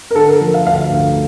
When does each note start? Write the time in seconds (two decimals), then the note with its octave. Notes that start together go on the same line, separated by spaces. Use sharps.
0.11 A#4
0.15 D3 A4
0.28 A#4
0.41 F3
0.54 F5
0.66 D2 F5
0.92 D2